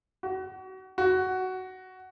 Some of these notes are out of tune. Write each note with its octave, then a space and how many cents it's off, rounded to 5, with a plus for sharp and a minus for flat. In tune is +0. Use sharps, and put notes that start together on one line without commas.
F#4 +30
F#4 +10